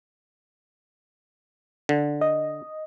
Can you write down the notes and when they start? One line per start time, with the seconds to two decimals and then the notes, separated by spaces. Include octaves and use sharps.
1.89 D3
2.21 D#5